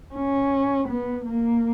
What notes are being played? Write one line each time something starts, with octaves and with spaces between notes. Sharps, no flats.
C#4
B3
A#3